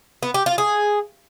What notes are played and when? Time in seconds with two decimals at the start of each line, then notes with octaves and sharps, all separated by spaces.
0.23 B3
0.34 G4
0.46 F4
0.58 G#4